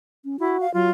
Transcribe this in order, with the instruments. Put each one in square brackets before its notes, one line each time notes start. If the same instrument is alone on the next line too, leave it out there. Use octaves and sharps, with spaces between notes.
[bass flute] C#4
[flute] E4 [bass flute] F#4
[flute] F5
[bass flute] F#3 [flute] F4